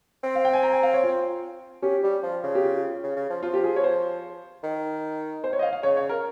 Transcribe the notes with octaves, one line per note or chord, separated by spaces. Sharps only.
C4
F5
G5
G#5
A#5
G#5
F5
C#5
F4
C#4 G4
G3
F3
C#3
G4
F4
C#3
C#3
F3
F3 F4
G4
G#4
C#5
C5
D#3
C5
C#5
D#5
F5
F5
C#3 C#5
C#5
A#4